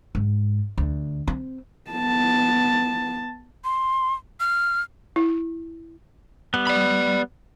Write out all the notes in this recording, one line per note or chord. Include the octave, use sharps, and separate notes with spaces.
G#2
D2
C4
B3 A5
C6
F6
E4
G3 B3
D5 B5